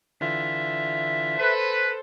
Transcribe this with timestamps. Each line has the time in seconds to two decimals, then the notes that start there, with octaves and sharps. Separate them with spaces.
0.21 D3 E3 F4 E5
1.37 A4 B4 C5